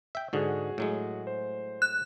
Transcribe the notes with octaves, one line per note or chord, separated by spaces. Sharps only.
E5 G5
G#2 D3 F#4 G#4
A2 F#3 G#3
C5
F#6